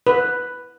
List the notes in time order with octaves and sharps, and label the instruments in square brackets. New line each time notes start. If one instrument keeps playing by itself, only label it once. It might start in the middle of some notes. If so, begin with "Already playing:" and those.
[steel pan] B4